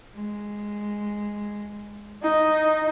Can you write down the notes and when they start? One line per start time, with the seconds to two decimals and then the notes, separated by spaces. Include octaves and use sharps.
0.14 G#3
2.23 D#4